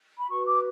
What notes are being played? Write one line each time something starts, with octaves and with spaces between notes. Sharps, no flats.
B5
F#4 B4 C#6
D6